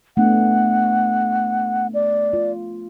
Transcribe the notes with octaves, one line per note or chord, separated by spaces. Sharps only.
A3 B3 D4 F#5
D5
F4